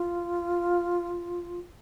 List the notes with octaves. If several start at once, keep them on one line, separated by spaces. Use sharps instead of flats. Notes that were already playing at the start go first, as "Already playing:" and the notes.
Already playing: F4